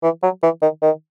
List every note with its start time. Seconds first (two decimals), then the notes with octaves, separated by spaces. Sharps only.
0.03 E3
0.23 F#3
0.43 E3
0.62 D#3
0.82 D#3